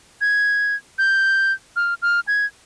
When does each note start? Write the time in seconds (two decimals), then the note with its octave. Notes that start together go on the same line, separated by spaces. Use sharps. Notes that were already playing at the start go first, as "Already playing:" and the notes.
0.21 G#6
0.98 G6
1.76 F6
2.02 F6
2.28 G#6